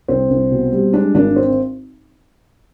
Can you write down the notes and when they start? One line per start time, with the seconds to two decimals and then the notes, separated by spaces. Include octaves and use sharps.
0.08 C2 C4
0.30 C2
0.51 B2
0.72 G3
0.93 G#3 D4
1.14 G#1 D4
1.36 C4